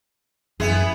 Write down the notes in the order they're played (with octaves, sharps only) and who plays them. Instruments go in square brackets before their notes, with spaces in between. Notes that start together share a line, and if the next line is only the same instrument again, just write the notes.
[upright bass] F#2 [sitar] B3 E4 G#4